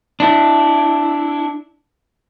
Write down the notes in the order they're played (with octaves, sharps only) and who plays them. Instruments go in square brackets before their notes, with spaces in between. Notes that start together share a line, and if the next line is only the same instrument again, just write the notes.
[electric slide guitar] D4 E4